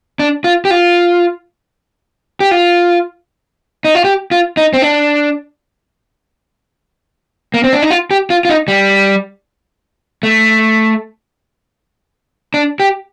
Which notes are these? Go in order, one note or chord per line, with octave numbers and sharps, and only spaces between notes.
D4
F4
G4
F4
G4
F4
D#4
F4
G4
F4
D#4
C4
D4
A#3
C4
D4
D#4
F4
G4
F4
F4
D#4
G3
A3
D4
G4